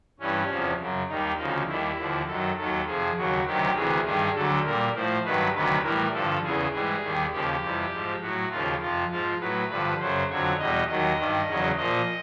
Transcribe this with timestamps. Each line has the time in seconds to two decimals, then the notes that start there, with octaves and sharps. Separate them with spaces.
0.20 G2 E3 G3 C#4
0.49 E2 C3 F3
0.80 F#2 C#3 F#3
1.09 D#2 D#3 G3 D#4
1.38 D2 C#3 F3 D#4
1.68 D#2 D#3 G3 E4
1.98 D#2 D3 F3
2.27 F#2 D#3 F#3 A4
2.58 D#2 D#3 F#3 A4
2.87 F2 C3 F3 G#4
3.17 D#2 C#3 F#3 F#4
3.47 D2 C3 D#3 F#3 G4
3.76 D2 C3 E3 G#4
4.05 G2 D#3 G3 G#4
4.35 D2 D3 F#3 A4
4.65 A#2 G3 A#4
4.95 A2 F3 C5
5.25 G2 D#3 F#3 B4
5.54 D2 C3 D#3 F#3 B4
5.83 A2 E3 G3 A#4
6.14 G2 D3 F3 A4
6.43 E2 C#3 E3 G#4
6.72 G#2 E3 G3 G#4
7.02 D#2 D#3 G3
7.32 D#2 C#3 F3 G4
7.62 F2 C3 E3 G3
7.92 G#2 F3
8.21 A2 F#3 F#4
8.51 D#2 C#3 F3 F4
8.81 F2 C3 F3 F4
9.10 G#2 F3 F4
9.40 A2 F#3 B4
9.69 G2 D3 F3 B4
9.99 F#2 C#3 F#3 C5
10.29 F2 D3 F#3 C#5
10.59 E2 B2 G3 D#5
10.89 D#2 D#3 F#3 D#5
11.19 G2 D#3 G3
11.48 E2 C#3 F#3
11.77 A#2 F3 D#5